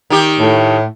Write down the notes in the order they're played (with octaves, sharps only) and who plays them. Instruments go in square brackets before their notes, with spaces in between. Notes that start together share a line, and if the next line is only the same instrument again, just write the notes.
[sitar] D#3 G4
[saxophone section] A2